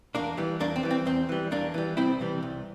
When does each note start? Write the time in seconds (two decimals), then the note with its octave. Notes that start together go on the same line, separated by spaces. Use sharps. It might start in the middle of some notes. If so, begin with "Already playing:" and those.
0.15 E2 A#3 D4
0.37 E3 G3
0.60 E2 A#3 D4
0.76 C4
0.83 E3 G3
0.91 C4
1.06 E2 C4
1.29 E3 G3
1.51 E2 A#3 D4
1.74 E3 G3
1.97 C2 C4 E4
2.20 C3 E3 G3
2.43 C2